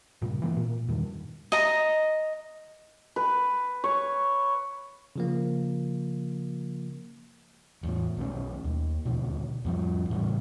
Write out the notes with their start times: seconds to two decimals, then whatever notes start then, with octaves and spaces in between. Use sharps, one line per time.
0.22 G2 A#2 C#3
0.42 E3 G#3 A#3
0.57 A#2
0.89 E2 G2 A#2 D#3
1.52 D#5 A#5
3.16 B4
3.84 C#5
5.16 C#3 F3 A#3
7.83 E2 A2
8.17 B1 A3 C#4
8.64 D#2
9.05 D#1 D2 B2
9.64 F2 F3 G3
10.10 A2 C#3 E3 G3